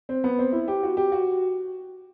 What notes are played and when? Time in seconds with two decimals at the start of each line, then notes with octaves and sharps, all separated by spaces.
0.09 C4
0.24 B3
0.39 C4
0.52 E4
0.68 G4
0.83 F#4
0.97 G4
1.12 F#4